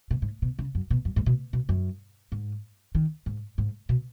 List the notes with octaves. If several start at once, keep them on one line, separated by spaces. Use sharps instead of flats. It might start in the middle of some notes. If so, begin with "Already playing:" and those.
B2
G#2
B2
C#3
F#2
B2
F#2
G#2
B2
B2
F#2
G#2
D#3
G#2
G#2
B2